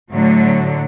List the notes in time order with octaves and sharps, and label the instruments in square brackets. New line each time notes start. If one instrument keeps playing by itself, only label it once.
[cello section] A2 D3 F#3